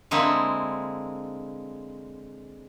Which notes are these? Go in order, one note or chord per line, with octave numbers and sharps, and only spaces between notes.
D3 G#3 A#3 C4 E4